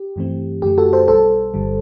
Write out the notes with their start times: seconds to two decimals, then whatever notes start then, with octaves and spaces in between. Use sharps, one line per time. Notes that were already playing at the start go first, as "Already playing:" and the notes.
Already playing: G4
0.16 G2 E3 A3 C4
0.62 F#2 D3 A3 G4
0.78 F#4 A4
0.93 A4 C5
1.08 B1 B2 G3 A4 C5
1.54 G1 G2 D3 G3